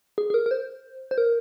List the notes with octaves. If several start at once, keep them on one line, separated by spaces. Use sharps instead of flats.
G#4
G#4
A#4
A#4
C5
C5
A#4